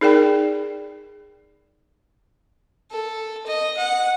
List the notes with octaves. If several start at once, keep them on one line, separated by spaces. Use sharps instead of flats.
D#4 G#4 A#4 D5 G5
A4
D#5
F#5